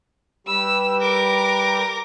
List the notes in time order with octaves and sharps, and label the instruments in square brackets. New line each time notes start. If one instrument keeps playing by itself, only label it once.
[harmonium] G3 G4 B4 [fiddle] E6
[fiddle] A#4 D6